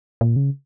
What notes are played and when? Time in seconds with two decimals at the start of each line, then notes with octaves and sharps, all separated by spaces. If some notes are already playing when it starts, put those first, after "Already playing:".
0.21 A#2
0.36 C#3